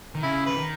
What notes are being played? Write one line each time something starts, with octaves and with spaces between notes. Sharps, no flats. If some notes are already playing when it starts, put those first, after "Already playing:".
D#3
C#3 E4
E3 B4
D#3